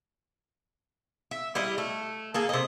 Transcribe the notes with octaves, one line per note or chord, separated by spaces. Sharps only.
E5
G3 E4 G4 D#5
A3
A#3 G#4 A4
C3 D#5